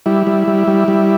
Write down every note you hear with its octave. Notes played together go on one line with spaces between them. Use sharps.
G3 E4
G3
G3
G3
G3